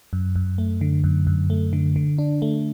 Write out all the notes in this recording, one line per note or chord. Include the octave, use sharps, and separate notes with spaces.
F#2
F#2
A3
D3
F#2
F#2
A3
D3
D3
D4
A3